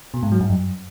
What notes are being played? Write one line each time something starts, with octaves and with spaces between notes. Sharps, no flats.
B2
G#2
F#3
G2
F#2